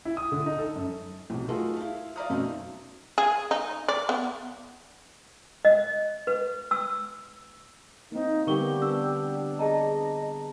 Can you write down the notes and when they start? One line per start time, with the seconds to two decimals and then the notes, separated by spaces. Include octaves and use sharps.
0.05 E4
0.17 D#6
0.32 D3
0.46 D#4
0.59 A4
0.76 F#2
1.30 B1 C3
1.49 A3 D#4 F4 F#4 G#4 A#4
1.76 E4 F5
2.16 D5 E5 F5 A#5 D#6 F6
2.30 F#2 B2 A3 C4 C#4 D#4
3.18 G#4
3.51 D#4
3.88 D5
4.09 B3
5.65 D#5
6.27 B4
6.71 E6
8.12 A#3 C4 D#4
8.47 D3 G3 B3 G4 A#4 C#6 G7
8.82 B3 D4 E6
9.59 G#4 D#5 A5 A#5